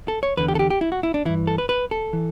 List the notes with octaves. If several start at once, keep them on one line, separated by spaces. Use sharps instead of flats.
A4
C#5
E2 D3 B4
G4
A4
G4
G4
E4
F#4
E4
D4
G2 E3 E4
A4
B4
B4
A4
E3